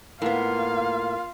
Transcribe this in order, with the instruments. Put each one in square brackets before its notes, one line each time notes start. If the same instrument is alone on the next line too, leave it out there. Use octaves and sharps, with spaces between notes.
[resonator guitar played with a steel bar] A2 B3 [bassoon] A#3 [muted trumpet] F4 [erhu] F5